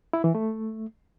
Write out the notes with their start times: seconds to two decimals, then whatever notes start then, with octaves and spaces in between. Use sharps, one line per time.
0.13 E4
0.24 E3
0.35 A3